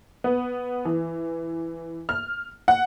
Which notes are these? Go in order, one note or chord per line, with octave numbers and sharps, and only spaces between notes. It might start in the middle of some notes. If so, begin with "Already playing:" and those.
B3
E3
F6
F#5